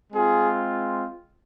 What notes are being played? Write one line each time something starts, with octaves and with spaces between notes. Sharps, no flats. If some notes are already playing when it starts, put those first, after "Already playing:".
G#3 C4 F4 G#4